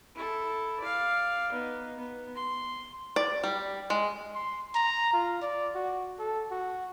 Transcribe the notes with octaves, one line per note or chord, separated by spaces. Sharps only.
E4 A4
D5 F5
B3 D#4
B3
C6
D5
G3
G#3
C6
A#5
F4
D5
F#4
A4
F#4